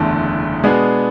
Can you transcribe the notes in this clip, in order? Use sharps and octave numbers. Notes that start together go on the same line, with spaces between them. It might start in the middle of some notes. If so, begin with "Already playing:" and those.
Already playing: F#1 E2 D3 A3
B2 G#3 B3 D4 G#4